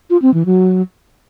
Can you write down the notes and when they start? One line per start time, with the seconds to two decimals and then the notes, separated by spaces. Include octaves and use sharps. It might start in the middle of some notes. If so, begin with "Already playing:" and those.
0.10 F4
0.22 C4
0.34 E3
0.46 F#3